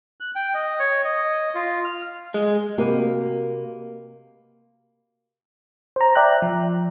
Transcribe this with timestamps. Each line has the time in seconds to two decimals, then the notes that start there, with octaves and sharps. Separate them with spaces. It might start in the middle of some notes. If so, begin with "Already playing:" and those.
0.20 F#6
0.36 G5
0.54 D#5
0.79 C#5
1.05 D#5
1.55 F4
1.85 F6
2.34 G#3
2.78 C3 A#3 F#4 G4 B4 D#5
5.96 C5 A#5
6.15 D5 E5 G5 A#5 F#6
6.42 F3